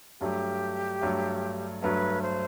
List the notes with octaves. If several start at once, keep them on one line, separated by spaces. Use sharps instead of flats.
G2 F#3 A3 G4
G2 F#3 A3
G2 F#3 A3 B4
C5